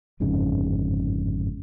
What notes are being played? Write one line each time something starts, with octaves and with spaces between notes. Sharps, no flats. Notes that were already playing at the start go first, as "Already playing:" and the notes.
G1 F2 G#2 C#3